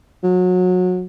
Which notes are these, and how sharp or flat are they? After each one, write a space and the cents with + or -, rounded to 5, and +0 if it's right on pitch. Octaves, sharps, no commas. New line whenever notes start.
F#3 -25